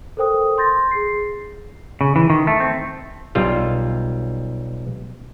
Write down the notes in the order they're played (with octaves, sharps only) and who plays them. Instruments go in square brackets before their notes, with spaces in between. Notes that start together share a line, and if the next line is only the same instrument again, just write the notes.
[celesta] A4 A#4 C5 G5 D#6
C6 G6 A6 A#6
G#4 C7
[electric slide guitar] C#3
E3
D#3
A3
C4
[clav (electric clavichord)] B1 G3 F4